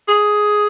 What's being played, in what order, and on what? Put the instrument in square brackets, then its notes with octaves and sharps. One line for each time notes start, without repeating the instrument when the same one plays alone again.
[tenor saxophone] G#4